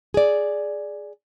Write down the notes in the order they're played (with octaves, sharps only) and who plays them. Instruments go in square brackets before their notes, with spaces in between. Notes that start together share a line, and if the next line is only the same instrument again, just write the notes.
[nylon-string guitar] G#4 D5